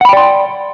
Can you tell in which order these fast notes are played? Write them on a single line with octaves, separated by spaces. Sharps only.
F#5 B5 G5 D5 C6